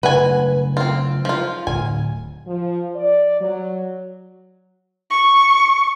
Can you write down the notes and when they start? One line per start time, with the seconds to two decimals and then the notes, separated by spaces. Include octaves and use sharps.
0.03 C#3 F#3 A3 B4 F#5 G#5
0.77 C4 F4
1.25 F3 F4
1.67 D1 G#5
2.47 F3
2.96 D5
3.40 F#3
5.10 C#6